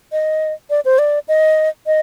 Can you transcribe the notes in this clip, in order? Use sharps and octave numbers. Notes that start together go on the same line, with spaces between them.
D#5
D5
C5
D5
D#5
D#5